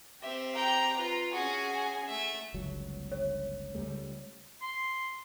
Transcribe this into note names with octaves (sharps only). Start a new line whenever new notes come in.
C4 G4 E5
G5 A#5
F4 B4
C#4 F#4 G#4 F#5 G#5
A3 E5
G1 C#2 F#3
C#5
C#2 G3 A3
C6